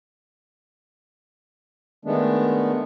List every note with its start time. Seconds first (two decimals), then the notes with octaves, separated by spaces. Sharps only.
2.05 D#3 G#3 A3 B3 D4